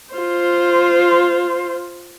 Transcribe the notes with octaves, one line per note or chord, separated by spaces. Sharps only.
F4 C5